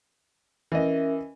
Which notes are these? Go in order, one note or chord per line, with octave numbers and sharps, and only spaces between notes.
E3 C#4 A#4 D#5 E5